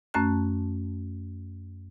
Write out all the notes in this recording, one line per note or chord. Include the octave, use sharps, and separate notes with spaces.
F#2 A3 C#4 A5 F#6